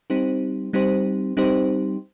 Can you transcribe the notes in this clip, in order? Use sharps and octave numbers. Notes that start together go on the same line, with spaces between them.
G3 C4 D#4 G4 C5
G3 C4 D#4 G4 C5
G3 C4 D#4 G4 C5